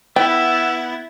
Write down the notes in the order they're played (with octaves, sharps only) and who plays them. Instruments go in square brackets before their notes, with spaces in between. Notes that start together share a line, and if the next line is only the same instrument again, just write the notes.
[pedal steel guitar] B3 [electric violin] E4 [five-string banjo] G5 [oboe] E6